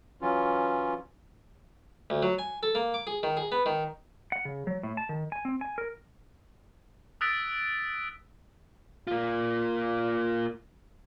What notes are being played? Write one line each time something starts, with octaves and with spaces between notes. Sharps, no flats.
E3 F#3 C#4 F4
D2
F#3
G#5
A4
A#3
D6
G#4
D#3
G#4
B3
D#3
F#5
C#3
F#3
A2
A5
D#3
G#5
C4
G#5
A#4
D#6 E6 F#6 A6 B6 D7
A#3 F4